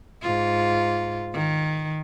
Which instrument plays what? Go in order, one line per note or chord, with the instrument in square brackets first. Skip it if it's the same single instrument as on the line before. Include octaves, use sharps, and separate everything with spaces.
[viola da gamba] G#2 F4
D#3